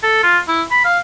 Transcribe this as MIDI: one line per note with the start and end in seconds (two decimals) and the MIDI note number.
0.03 0.20 69
0.23 0.39 65
0.48 0.62 64
0.71 0.82 83
0.85 0.99 77